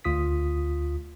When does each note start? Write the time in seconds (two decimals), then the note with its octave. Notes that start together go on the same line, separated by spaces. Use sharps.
0.04 D2 F4 D#6 B6